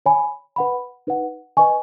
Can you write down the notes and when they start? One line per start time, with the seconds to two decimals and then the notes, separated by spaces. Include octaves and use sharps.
0.06 C#5 G#5 B5
0.56 B4 F#5 B5
1.07 D#4 B4 F#5
1.57 B4 D#5 G#5 C#6